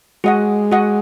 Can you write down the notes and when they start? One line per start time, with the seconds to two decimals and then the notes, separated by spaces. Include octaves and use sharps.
0.24 G#3 F#4 D#5 F#5
0.71 F#4 D#5 F#5